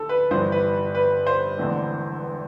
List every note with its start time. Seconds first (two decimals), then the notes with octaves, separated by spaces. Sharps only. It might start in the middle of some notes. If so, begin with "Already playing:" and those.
Already playing: D2 A4
0.09 B4
0.30 G1 G2 E3 C5
0.52 B4
0.95 B4
1.27 C5
1.58 E1 E2 D3 A3 C4